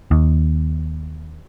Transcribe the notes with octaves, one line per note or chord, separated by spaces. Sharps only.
D#2